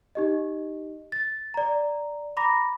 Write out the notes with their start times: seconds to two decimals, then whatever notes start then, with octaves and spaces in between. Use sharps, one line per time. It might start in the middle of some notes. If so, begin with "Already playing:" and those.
0.15 D#4 G4 D#5
1.12 A6
1.54 D5 A#5
2.37 A#5 B5 D6 A#6